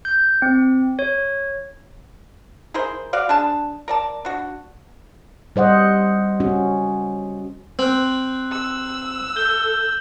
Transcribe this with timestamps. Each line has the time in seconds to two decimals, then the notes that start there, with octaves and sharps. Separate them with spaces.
0.05 G6
0.42 C4
0.99 C#5
2.74 E4 G#4 A#4 C5
3.13 F#4 D5 F5
3.29 D4 G#4 A5
3.88 A#4 D5 A5
4.25 D4 F#4
5.56 G3 C5 D#5 F#5
6.40 C#4 F#4
7.79 C4 F#6 F#7
8.52 E6
9.36 A4 G6 G7